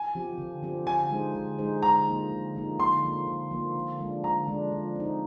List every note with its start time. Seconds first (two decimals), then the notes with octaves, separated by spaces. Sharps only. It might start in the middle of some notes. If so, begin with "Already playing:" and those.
Already playing: G#5
0.15 F3 C4 G4
0.38 D3
0.63 F3 C4 G4
0.87 D3 G#5
1.11 G#3 D#4 G#4 C5
1.35 D3
1.59 G#3 D#4 G#4 C5
1.83 D3 A#5
2.07 F3 A#3 D#4
2.31 D3
2.55 F3 A#3 D#4
2.79 D3 C6
3.03 F3 A#3
3.27 D3
3.51 F3 A#3
3.75 D3
4.00 F3 G#3 D4
4.24 D3 A#5
4.47 F3 G#3 D4
4.72 F3
4.96 C4 D#4